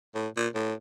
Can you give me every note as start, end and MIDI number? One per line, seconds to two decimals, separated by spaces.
0.15 0.28 45
0.37 0.48 46
0.55 0.74 45